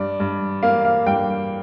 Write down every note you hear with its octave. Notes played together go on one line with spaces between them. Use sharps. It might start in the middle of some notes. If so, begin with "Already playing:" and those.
Already playing: G2 D5
G2
A#3 F5
F5
G2 G5